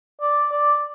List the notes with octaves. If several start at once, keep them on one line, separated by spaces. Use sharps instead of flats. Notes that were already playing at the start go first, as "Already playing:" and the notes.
D5
D5